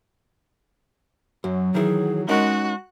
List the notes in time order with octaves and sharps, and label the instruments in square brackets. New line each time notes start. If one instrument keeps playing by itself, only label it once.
[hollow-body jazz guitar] F#2 [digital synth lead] F#3
[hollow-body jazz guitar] D#3 E3 [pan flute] G#4
[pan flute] G#3 [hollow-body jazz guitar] C#4 D#4 A#4 [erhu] F#4 [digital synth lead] F#6